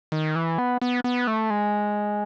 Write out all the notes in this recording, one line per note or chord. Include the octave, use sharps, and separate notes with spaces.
D#3
E3
B3
B3
B3
A3
G#3